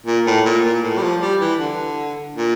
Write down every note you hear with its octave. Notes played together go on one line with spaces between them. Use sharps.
A#2
A2
A#2
A#2
A2
G3
F3
G3
E3
D3
A#2